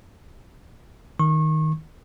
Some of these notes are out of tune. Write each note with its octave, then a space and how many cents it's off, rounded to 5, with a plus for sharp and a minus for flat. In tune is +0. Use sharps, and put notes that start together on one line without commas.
D#3 +5 C#6 -30